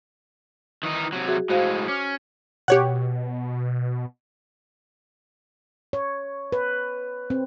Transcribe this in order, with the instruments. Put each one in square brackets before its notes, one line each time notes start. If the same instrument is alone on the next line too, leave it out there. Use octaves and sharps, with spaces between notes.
[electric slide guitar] D#3 E3 D#4
C3 F#3
[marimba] F#4 G#4 E5
[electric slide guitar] A2 G#3 [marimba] F#4 C5 F5
[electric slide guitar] C#4 [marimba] D6 F6
[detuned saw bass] B2 [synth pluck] G4 C#5 F#5
[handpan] C#5
B4
C4